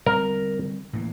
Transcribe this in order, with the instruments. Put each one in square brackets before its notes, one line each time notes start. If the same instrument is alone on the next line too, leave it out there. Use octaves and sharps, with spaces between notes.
[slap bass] D3 G3 C4 [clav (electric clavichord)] A#4
[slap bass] A2 E3 A#3